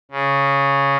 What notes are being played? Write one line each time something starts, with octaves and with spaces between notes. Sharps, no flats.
C#3